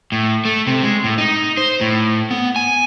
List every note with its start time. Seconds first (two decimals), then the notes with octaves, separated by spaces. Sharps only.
0.12 A2
0.45 A3
0.67 C3
0.83 G#3
1.04 A2
1.18 D#4
1.57 C5
1.81 A2
2.31 B3
2.56 G#5